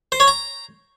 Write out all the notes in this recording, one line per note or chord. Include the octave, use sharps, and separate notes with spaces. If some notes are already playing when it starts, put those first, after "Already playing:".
C5
C#5
A#5